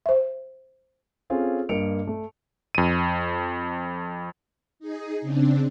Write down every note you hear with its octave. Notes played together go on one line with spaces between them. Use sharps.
C5 E5
C4 C#4 F4 G#4 A4
G2 A#3 D#5 C#7 D7 F7
A3
F2 D#7
D#4 G#4
C#3 C4 D4